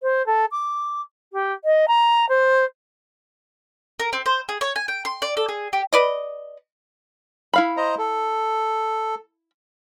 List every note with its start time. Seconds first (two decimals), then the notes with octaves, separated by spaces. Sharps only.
0.03 C5
0.26 A4
0.52 D6
1.33 G4
1.64 D#5
1.88 A#5
2.29 C5
4.00 A#4
4.13 C4
4.26 C5
4.49 G#4
4.61 C#5
4.76 G#5
4.88 G5
5.05 C6
5.22 D5
5.37 A4
5.49 G#4
5.73 G4
5.93 B4 D5 D#5
7.53 E4 F5 B5
7.77 C5 D#5 A#5
7.98 A4